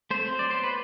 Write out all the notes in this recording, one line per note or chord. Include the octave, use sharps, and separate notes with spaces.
A3 C4 C5
F#3
D5
B3 C5
B4